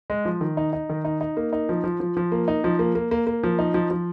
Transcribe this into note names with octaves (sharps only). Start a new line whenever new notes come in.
G#3
F3
D#3
D#4
D#4
D#3
D#4
D#4
A#3
D#4
F3
F3
F3
F3
A#3
D#4
F3
A#3
A#3
A#3
A#3
F3
D#4
F3
F3